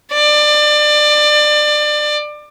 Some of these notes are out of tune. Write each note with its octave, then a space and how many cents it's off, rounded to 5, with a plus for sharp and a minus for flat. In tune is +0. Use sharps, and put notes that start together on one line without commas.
D5 +25